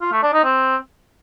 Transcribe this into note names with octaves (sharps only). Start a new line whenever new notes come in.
F4
A3
D4
D#4
C4